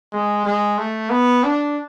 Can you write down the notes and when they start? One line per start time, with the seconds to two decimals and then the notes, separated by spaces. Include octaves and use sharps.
0.13 G#3
0.45 G#3
0.78 A3
1.10 B3
1.44 D4